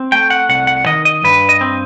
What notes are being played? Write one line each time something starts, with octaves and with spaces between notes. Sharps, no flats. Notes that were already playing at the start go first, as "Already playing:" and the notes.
Already playing: C4
A3 G5
F#5
C2 F#5
F#5
D#3 D#5
D#5
G2 B4
D#5
C4